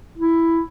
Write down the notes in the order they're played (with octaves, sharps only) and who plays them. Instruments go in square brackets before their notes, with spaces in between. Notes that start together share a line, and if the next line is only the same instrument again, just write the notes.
[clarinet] E4